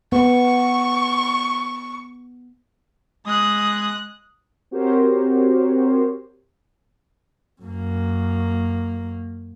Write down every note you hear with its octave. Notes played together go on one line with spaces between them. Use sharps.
B3 C#6
G#3 D#6 F#6
C4 F#4 G4 A#4 C5 C#5
F#2 A#3